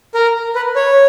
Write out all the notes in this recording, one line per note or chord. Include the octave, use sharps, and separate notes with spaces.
A#4
B4
C#5